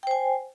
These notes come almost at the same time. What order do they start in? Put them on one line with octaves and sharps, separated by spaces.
G5 C5 G#5